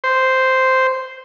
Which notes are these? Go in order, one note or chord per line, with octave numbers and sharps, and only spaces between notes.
C5